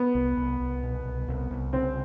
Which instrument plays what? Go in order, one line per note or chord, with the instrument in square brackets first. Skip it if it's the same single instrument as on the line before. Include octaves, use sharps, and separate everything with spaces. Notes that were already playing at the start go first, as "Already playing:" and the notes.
Already playing: [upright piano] B3
[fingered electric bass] C2
C2
C2
B2
C2
C2
C2
[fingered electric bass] C#3 [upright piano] C4